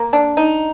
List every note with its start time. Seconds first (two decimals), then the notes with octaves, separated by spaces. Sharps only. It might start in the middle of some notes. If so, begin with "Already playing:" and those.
Already playing: A#3
0.13 D4
0.37 D#4